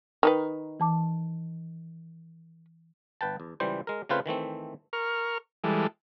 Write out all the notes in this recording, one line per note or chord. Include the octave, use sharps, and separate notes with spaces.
D#3 D#4 B4
E3 A5 D6
G1 B4 G5 A5
E2
C#2 E3 G3 C5
G#3 A#4
C#3 A3 C4 F4 B4 C5
D#3 E3 A3 C4
A#4 C#6 F6
E3 G3 G#3 A4